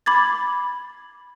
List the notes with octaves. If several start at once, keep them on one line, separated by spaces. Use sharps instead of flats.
B5 D6 G#6 A6